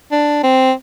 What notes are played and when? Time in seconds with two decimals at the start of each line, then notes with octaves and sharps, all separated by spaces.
0.12 D4
0.44 C4